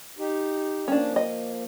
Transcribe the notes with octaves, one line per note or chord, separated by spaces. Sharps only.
D#4 G4
F3 A#3 C#4 D4
D#5